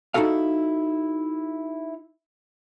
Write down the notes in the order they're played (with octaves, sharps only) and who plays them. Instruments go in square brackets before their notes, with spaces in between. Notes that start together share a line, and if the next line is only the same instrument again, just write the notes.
[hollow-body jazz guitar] D#4 E4 F#4 A4 F5